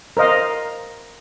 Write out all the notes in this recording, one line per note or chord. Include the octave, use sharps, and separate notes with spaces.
A#4 C5 D#5 F5